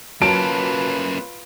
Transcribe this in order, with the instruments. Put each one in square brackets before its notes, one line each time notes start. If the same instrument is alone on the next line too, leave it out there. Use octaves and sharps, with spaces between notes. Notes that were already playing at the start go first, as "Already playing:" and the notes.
[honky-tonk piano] F#3 A5 [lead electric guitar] A#3 C#4 [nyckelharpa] F4 B4 [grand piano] D7